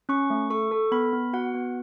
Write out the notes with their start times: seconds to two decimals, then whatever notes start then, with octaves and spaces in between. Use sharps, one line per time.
0.09 C#4 C#6
0.30 A3
0.50 A4 C#6
0.71 A4
0.92 B3 B5
1.13 B3
1.33 F#4 F#5
1.54 B3